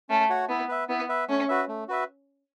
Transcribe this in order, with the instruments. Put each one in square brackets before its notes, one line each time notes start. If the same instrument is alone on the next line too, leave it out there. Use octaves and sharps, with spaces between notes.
[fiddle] A3 [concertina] C#4
[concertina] F#4 C#5 F#5
[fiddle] B3 [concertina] E4
[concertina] B4 E5
[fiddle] B3 [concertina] E4
[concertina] B4 E5
[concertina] A3 [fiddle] C#4
[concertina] F#4 B4 E5
A3
F#4 B4 E5